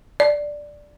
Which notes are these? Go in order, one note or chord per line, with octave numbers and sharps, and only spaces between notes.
D5